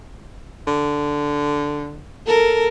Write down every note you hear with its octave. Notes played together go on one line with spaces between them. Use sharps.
D3
A4 A#4